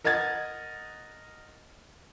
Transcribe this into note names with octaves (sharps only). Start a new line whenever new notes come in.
A#4 D#5 F#5 G#6 A6